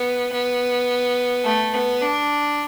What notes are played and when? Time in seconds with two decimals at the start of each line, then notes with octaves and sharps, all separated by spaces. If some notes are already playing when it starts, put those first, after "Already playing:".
Already playing: B3
0.32 B3
1.45 A3
1.73 B3
2.02 D4